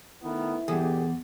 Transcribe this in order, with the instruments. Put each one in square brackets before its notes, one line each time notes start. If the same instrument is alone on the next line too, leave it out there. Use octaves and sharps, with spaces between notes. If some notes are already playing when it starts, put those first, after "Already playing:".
[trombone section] D#3 A3 B3 [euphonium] E4
[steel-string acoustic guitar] E2 [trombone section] B2 D3 G4 [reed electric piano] G#4